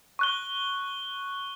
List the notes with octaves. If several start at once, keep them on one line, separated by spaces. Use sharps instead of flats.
C#6 F#6 G7